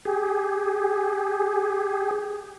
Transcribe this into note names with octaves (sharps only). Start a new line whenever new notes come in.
G4 G#4